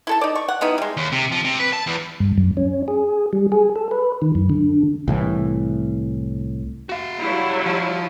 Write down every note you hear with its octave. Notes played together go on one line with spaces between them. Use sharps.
E4 A4 A5
D#4 D5
C#6
F#5
G3 B3 D#4 E4
G3 G#3
D#2
C3
F3
C3
B4
A5
E2
G2
F#2
C#4
G#4
G3
G#4
A4
B4
D#3
F#2
D3
C2 A2 E3
F#4 F5
F#3 G3 E4
F3 F4